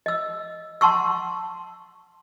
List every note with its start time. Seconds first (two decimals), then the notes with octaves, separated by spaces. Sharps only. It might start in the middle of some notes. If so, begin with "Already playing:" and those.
0.06 D#5 E6
0.81 F#5 A5 C6 C#6 E6